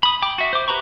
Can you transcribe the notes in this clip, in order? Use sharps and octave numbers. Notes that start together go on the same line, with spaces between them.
B5 D#6
G5 D6
F#4 E5
C5 D6
G4 B4 A#5 B5 C#6